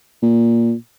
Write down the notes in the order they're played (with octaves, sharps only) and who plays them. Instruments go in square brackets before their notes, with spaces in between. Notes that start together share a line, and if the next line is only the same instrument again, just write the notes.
[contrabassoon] A#2